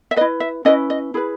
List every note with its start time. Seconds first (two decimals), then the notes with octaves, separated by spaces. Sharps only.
0.11 E5
0.16 B4 D#5
0.21 E4
0.40 E5
0.65 C#4 E4 B4 D#5
0.90 D#5
1.14 E4 G#4 B4